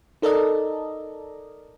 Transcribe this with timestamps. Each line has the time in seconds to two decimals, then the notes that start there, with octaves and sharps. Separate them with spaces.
0.22 D#4 A4 A#4 D5 D#5